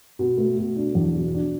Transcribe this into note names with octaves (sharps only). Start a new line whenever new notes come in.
B2
A3
B2
D4
E2
B2
D4